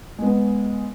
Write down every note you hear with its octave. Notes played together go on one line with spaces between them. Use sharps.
G#3 B3